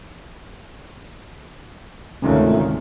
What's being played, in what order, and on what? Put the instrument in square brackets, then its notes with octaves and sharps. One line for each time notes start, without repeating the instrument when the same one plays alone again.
[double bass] D2 D#3 [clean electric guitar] G#2 C3 [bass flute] A3 [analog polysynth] C#4 F4